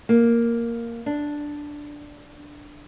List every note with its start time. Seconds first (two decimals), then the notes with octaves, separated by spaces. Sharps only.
0.09 A#3
1.06 D4